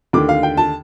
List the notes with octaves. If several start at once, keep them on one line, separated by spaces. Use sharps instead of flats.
D#2 D3 A3 D6
F5
G5
A5